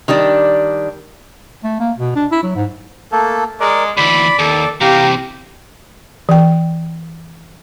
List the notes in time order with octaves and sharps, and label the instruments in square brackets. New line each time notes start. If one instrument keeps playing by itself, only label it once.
[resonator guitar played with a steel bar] D#3 G3 D4 D5
[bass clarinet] A3
A#3
B2
D4
E4
F#3
G#2
[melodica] A3 A#3 A4
[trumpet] G#3 [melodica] A#4 D5
[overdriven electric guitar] D2 E3 [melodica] D5 [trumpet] B5
[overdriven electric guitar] D#2 [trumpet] A4
[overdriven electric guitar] C3 E3 [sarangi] G4 [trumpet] F5 [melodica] A#5
[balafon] E3 G5